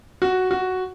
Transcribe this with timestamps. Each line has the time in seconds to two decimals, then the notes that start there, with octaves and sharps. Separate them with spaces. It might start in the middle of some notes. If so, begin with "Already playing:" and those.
0.22 F#4
0.51 F#4